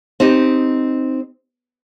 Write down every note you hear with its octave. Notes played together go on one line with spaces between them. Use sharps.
C4 D#4 G4 D#5